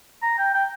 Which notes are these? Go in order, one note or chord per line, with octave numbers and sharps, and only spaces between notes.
A#5
G5
G5